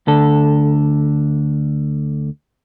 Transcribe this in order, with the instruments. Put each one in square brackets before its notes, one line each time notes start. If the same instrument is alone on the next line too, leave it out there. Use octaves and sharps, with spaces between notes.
[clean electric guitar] D2 D3 A4